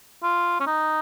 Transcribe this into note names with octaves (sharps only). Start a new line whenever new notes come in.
F4
C#4
D#4